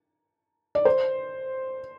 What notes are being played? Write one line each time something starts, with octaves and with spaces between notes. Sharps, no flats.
D5
C5